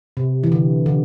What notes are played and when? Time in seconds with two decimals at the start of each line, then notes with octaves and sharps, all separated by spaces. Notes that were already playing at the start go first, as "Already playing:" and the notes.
0.17 C3
0.43 E3
0.52 D3
0.86 D3